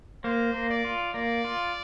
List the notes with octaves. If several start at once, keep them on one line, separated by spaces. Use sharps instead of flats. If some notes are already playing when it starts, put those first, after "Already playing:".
A#3 C5
A#3
D5
F4
A#3 D5
F4